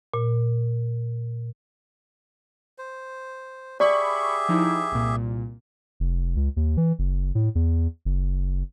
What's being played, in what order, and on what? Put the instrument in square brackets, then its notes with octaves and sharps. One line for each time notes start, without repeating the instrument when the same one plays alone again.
[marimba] A#2
[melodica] C5
[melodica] G4 G#4 E5 [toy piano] D5 [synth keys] B5 C#6
[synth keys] F3 D#4 E4
C2 A#2
[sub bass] F1
C#2
D#2
E3
F#1
A2
E2
F#1